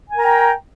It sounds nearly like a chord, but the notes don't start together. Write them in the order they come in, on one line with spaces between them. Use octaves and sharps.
G#5 A#4 A#5 G5